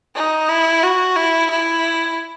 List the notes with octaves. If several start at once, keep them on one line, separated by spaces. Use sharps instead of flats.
D#4
E4
F#4
E4
E4